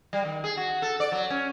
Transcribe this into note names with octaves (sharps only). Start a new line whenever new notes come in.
G3
D#3
G#4
F#4
A4
D5
F#3
C#4